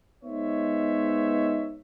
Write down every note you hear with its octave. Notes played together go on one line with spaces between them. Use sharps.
G#3 B3 D#4 C5 C#5 E5